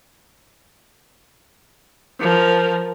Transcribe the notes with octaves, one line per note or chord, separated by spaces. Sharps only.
F3 A#4